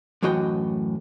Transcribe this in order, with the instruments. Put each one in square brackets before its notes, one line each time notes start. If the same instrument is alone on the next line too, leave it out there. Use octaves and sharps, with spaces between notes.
[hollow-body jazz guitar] F#2 A2 E3 F#4 D#5 G5